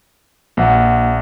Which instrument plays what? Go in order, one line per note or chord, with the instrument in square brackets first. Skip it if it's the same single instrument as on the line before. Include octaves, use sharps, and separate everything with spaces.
[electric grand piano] A#1 [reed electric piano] A#3 F#5